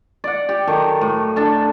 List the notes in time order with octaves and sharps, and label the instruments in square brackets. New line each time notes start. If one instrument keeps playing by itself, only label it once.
[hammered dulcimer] D5 F#5
G4
D#3 F#3 A4
A2
D4 A4